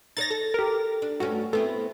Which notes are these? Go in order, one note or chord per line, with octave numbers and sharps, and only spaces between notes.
D#4 A#4 C#5 A6 A#6
A4
G4 A#4
D4
G2 A3 C#4 F#4
A3 B3 C4 E4